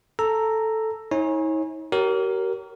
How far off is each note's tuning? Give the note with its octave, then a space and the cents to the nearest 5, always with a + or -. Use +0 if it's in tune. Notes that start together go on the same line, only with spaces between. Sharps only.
A4 +0 A#5 -5 E6 +5
D#4 +45 C#5 -30 G#5 -5
G4 -40 A#4 +0 C#5 +0